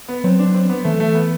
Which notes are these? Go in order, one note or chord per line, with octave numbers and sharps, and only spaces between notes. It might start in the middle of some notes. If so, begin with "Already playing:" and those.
B3
F#3 C4
D4
C4
B3
E3 A3
A3
B3